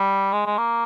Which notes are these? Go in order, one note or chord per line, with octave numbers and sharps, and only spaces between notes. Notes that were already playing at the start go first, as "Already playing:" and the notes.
Already playing: G3
G#3
G#3
A#3